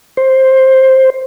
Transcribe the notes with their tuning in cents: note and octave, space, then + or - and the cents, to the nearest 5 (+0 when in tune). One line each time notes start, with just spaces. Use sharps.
C5 +10